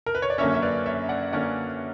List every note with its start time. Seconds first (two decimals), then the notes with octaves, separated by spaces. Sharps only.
0.06 A#4
0.15 B4
0.22 C#5
0.30 D5
0.38 F#2 D3 A#3 C#4 C#5 E5
0.54 E5
0.62 B4 D5
0.86 C#5 E5
1.09 D5 F#5
1.33 D3 A#3 C#4 D5 F#5